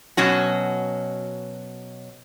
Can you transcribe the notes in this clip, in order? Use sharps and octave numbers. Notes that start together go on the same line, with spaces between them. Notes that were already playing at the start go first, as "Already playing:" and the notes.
B2 F#3 C#4 F#4